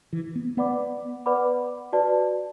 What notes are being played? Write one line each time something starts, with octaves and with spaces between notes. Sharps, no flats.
E3
B3
B3 B4 D5 F#5 B5 D6
B4 D5 F#5 B5 D6
F#4 B4 D5 A5